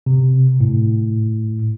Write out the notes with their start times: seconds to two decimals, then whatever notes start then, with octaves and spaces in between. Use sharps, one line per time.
0.06 C3
0.61 A2